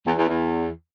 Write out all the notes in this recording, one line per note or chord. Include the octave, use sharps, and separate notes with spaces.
E2
E2
E2